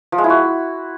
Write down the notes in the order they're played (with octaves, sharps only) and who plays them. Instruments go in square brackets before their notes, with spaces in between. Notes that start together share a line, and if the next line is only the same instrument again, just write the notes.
[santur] F3
G#3
E4
F#4